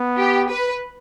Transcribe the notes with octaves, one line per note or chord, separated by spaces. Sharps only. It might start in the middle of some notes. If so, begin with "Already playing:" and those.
Already playing: B3
G4
B4